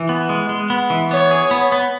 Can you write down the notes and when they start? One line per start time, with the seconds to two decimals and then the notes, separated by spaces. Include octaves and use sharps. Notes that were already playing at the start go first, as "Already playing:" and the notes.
Already playing: E3
0.09 B3
0.29 G#3
0.49 G#3
0.70 B3
0.90 E3
1.11 B3 C#5
1.31 G#4
1.51 B3
1.72 B3